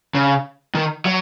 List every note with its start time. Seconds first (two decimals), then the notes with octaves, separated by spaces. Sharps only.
0.15 C#3
0.75 D#3
1.05 F#3